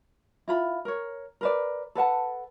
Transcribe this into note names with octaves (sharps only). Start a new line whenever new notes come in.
E4 F4 B5
A#4 C#5
A#4 B4 D5
A4 B4 F#5 A5